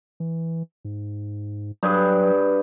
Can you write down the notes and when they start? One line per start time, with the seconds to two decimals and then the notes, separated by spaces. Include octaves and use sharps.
0.20 E3
0.85 G#2
1.83 G2 F#3 G#4 B4